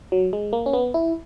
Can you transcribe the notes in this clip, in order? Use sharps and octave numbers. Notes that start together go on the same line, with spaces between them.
F#3
G#3
A#3
C#4
B3
E4